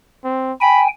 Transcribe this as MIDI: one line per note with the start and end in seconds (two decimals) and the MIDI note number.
0.24 0.53 60
0.61 0.88 79
0.61 0.88 80
0.61 0.84 83